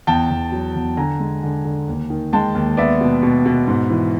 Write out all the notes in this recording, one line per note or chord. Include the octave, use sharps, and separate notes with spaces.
E2 G5 A5
E2
F#3
E2
D3 G#5 A#5
G#3
D3
D3
D#2
D#3
G#3 G5 A5
D#2
B3 D5 E5
B2
B2
B2
G#2
E3